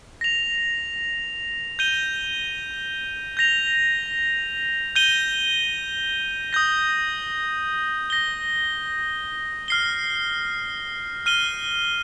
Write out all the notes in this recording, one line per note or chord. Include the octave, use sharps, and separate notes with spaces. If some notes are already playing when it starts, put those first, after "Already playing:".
A#6 F7
G6 D#7 G7
G6 A#6 F7
G6 D#7 G7
D#6 G6 A#6
A#6 G7
F6 C7 G7
F6 D#7 G7